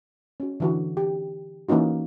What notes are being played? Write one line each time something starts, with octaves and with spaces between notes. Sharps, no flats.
C#4 F#4
D3 E3 F#4
G4
E3 A#3 C#4 D#4 F#4